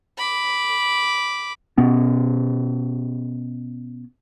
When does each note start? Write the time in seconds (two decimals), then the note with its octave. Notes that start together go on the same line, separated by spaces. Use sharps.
0.18 B5 D6
1.78 B2 B3 C#4